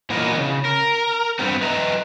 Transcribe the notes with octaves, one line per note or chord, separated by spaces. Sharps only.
A#2 E3 F#3 B3 D#4 A#4
C#3
A#4
G2 B3 C4
B4 D#5 E5 A#5